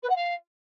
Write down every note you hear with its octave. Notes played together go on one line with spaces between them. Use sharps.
B4
F#5
F5